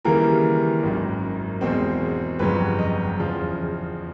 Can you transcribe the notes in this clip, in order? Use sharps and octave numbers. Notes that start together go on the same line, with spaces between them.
D#2 C#3 E3 G3 A#3 A#4
G#1 F#2 D#3
E2 B2 G#3 C4
G1 F2 C#3 F#3 B4
D#5
E2 C#3 F3